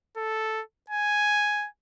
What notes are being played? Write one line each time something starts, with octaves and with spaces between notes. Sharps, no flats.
A4
G#5